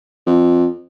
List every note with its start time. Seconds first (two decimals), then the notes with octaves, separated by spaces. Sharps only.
0.26 F2